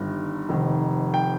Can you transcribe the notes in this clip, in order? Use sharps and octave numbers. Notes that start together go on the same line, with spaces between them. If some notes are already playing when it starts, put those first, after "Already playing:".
Already playing: G1 G2 D#3
F1 F2 D#3
G5